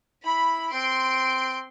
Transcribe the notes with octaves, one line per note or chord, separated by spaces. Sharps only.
E4 B5
C4 C6 D7